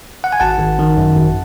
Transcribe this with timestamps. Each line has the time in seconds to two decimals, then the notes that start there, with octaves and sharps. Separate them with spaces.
0.24 F#5
0.32 G#5
0.40 G#1 F#5 A5
0.59 G#1
0.79 D#3
0.97 F#2
1.16 G#1